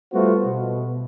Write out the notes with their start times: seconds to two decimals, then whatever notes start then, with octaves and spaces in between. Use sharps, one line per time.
0.12 G3 A3 B3 F4 F#4 C5
0.45 B2